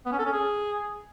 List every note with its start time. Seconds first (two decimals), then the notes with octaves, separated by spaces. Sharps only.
0.06 B3
0.12 C#4
0.19 A4
0.25 C#4
0.32 G#4